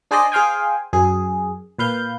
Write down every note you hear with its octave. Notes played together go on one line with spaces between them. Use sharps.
D4 G#4 C5 D5 D#5
G#4 C5 F5 G5 G#5
F#2 G#4
A#2 B4 F5 G6